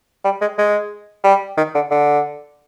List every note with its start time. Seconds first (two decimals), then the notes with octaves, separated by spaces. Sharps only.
0.24 G3
0.41 G#3
0.58 G#3
1.24 G3
1.57 D#3
1.75 D3
1.90 D3